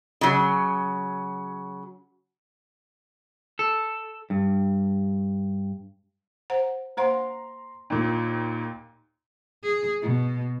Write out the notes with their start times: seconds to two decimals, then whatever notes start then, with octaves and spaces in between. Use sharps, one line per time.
0.21 C#3 F#3
3.59 A4
4.30 G2
6.50 C5 F#5 A#5
6.97 A#3 C5 F#5 A#5 C6
7.90 D#2 A#2
9.64 G#4
10.03 B2